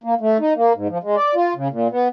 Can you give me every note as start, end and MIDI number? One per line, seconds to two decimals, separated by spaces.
0.04 0.14 58
0.21 0.38 57
0.40 0.53 63
0.56 0.73 58
0.75 0.88 44
0.89 0.98 53
1.03 1.16 56
1.16 1.34 74
1.35 1.53 65
1.56 1.68 49
1.71 1.88 46
1.91 2.08 59